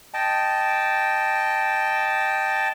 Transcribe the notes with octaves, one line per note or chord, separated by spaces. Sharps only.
D#5 G5 A5